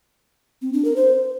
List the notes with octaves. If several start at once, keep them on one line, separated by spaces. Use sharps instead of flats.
C4
D4
A#4
C5